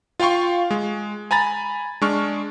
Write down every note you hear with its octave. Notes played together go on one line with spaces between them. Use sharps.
F4 F5 G5 C6 C#6
G#3
G#5 A#5 B5 A6
G#3 D4 C#6 F6